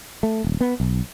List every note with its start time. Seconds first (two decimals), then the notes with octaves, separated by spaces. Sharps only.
0.23 A3
0.44 D#1
0.61 B3
0.80 B1